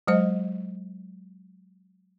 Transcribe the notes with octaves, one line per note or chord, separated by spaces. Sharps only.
F#3 G#3 C5 D#5